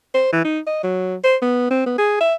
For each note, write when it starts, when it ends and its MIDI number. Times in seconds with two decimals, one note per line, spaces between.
0.14 0.31 72
0.32 0.44 52
0.44 0.59 63
0.67 0.80 75
0.84 1.16 54
1.24 1.36 72
1.42 1.67 59
1.71 1.84 60
1.86 1.95 59
1.98 2.20 68
2.20 2.34 76